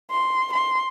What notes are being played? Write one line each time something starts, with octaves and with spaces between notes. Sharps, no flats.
C6
C6